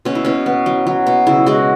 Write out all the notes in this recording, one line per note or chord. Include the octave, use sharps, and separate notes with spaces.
B2 C#4
E4
B2 C#4
B3
F#3
F#3
B2
C#3 E4
G#3 F#4